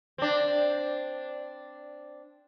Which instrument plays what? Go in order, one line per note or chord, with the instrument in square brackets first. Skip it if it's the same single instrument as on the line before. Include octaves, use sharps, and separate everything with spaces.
[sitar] C4 D4